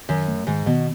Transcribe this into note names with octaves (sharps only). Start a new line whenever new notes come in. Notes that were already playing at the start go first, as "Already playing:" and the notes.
F#2 D#3
A3
G#2 D#3
B2 D#3